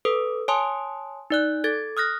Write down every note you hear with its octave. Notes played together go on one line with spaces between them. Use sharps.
A4 B4 D#6
C#5 G#5 A5 C6 D#6
D#4 D5 F#6
A4 G#6 A6
D#6 F6 F#6 A#6